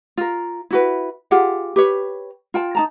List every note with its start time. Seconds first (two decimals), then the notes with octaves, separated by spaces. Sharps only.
0.18 F4 A#4
0.71 E4 F#4 B4
1.31 F4 G4 G#4 F#5
1.76 G4 B4 C#5
2.54 F4 G5 A5
2.75 D#4 A5 A#5